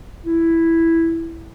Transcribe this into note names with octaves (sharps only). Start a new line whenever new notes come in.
E4